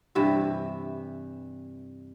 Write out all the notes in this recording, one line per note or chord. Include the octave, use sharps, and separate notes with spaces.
G2 C3 E3 E5